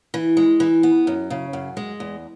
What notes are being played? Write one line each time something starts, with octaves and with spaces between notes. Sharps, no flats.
E3
G#3
E3
B3
F#2
C#3
F#2
G#3
E2